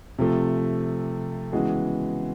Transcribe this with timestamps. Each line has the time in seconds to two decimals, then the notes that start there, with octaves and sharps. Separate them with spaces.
0.19 C3 F3 A3
1.52 C#3 E3 G#3 B3 F#4 G#4